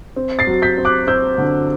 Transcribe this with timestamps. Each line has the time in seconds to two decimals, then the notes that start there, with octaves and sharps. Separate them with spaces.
0.16 C4
0.39 A6 C7
0.47 F#3
0.62 G6 B6
0.78 C4
0.85 D6 F#6
1.07 C4 E6 G6
1.38 D3